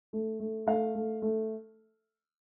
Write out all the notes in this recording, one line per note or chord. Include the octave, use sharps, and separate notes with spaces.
A3
A3
A3 F5
A3
A3